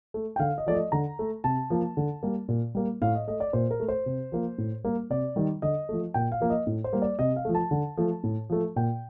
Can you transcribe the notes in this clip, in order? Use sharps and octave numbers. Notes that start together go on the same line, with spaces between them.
A3
G5
D3 F5
D#5
F3 A3 D5
D#5
D3 A#5
A3
C3 A5
F3 A#3
D3
G3 A#3
A#2
G3 A#3
A2 F5
D#5
A3 D#5
D5
A#2 C5
A#4
A3
C5
C3
F3 A#3
A2
G3 A#3
C3 D5
D#3 G3
D3 D#5
F3 A3
A#2 G5
F5
F3 A#3
D#5
A2
C5
G3 A#3
D5
C3 D#5
F5
F3 A3
A5
D3
F3 A3
A2
F3 A3
A#2 G5